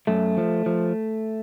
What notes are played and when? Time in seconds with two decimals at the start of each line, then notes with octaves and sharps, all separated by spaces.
0.07 F#2 A3
0.37 F3
0.66 F3